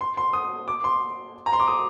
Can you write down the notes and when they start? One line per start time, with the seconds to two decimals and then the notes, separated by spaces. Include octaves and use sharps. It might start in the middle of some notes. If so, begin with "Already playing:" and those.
0.01 C6
0.17 C6
0.33 D#6
0.68 D6
0.84 C6
1.46 A#5
1.53 C6
1.60 D6
1.67 D#6